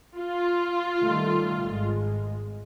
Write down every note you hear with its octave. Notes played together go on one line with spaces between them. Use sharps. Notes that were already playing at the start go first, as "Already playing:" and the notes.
F4
D#3 G3 A3
G#1 G#3